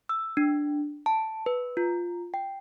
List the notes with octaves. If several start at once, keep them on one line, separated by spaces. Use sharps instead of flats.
E6
D4
A5
B4
F4
G5